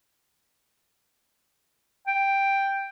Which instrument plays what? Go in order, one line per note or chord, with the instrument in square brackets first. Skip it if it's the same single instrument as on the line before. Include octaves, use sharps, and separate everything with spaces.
[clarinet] G5